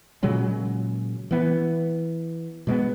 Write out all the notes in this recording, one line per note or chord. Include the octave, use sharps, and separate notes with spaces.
A#2 C#3 F#3 G#3
E3 B3
B2 G#3 A#3 B3